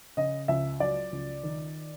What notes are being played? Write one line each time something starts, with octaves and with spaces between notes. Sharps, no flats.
C#3 D#5
C#2 E5
F#3 D5
C#2
D#3